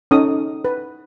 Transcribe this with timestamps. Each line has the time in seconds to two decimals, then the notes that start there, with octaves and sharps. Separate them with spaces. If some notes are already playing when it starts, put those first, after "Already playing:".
0.11 C#4 D#4 A4 D#6
0.65 B4